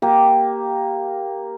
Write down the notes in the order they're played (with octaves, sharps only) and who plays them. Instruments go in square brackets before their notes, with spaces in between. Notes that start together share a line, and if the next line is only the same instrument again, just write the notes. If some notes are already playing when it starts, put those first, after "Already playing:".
[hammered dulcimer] A#3 G4